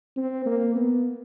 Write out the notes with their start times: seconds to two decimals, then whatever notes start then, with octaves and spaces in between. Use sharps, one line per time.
0.16 C4
0.45 A#3
0.76 B3